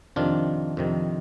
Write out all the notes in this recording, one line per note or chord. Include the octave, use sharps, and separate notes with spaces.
F2 C3 D#3 D4 F4
F2 C3 D#3